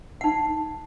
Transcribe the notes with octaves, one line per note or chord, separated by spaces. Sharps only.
D#4 F#5